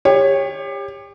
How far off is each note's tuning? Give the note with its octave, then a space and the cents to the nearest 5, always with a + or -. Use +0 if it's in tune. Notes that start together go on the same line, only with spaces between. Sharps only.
G4 +30 C#5 -10